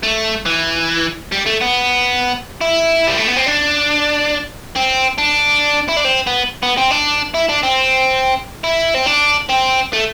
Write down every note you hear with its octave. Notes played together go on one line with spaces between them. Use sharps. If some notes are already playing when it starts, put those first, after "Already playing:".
A3
E3
G3
A3
B3
E4
G3
A3
B3
C4
D4
C4
D4
E4
D4
C4
B3
B3
C4
D4
E4
D4
C4
E4
C4
D4
C4
A3